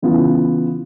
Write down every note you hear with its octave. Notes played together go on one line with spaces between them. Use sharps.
C#3 E3 B3 F4